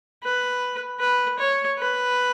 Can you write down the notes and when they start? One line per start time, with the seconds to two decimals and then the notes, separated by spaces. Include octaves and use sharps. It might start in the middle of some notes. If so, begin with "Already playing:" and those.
0.24 B4
1.00 B4
1.39 C#5
1.79 B4